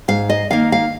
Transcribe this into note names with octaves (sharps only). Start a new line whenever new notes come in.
G#2 F5
D#5
D#3 A#3 F5
F5